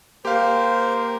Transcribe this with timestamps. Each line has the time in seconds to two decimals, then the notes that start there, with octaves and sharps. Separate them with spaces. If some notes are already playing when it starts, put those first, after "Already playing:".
0.25 A#3 G4 C5 F5